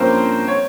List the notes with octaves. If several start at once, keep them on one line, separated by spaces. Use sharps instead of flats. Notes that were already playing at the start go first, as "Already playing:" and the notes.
Already playing: G2 F3 A#3 C4 C#4 C5
C#5